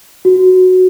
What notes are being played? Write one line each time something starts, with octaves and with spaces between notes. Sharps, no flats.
F#4